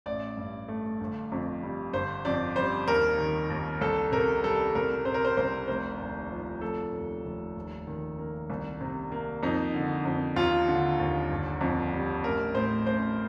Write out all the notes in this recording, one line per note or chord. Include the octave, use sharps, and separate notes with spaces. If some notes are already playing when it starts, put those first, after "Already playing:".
A1 D5
G2
A3
G1
F2
G3
G1 C5
F2 D5
G3 C5
D#2 A#4
D#3
D#2
C2 A4
C3 A#4
G3 A4
C2 A#4
C3 C5
A#4
C5
C2 C5
F1 C5
D#2
F3
F1 A4
D#2
F1
D#2
D#3
A#3
C2
C3
A#3
F2 D#4
D3
F2
D#2 F4
D3
D#2
G1
F2
G3
A1 A#4
A2 C5
A1 C5